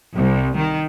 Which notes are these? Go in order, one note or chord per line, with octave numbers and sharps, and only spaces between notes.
C2
D#3